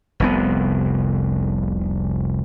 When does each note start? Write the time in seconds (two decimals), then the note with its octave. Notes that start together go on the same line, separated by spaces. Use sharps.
0.20 F1 C2 B3